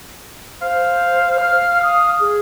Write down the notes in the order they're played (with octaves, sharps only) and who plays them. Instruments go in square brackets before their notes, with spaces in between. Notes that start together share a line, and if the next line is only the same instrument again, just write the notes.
[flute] C5 [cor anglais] F5
[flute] F6
D#6
G#4